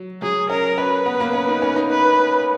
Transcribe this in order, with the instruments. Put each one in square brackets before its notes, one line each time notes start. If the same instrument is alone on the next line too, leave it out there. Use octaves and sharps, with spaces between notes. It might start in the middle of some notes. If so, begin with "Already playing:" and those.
Already playing: [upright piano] F#3
[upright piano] F#3 [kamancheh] G#4
[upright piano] C#4 [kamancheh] A#4
[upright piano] C#4 [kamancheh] B4
[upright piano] B3
A#3
C#4
D#4
C#4
D#4
[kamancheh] B4